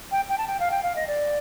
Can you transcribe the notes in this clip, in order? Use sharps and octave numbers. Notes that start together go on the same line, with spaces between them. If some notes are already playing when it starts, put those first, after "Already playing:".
G5
G5
A5
G5
F5
G5
F5
D#5
D5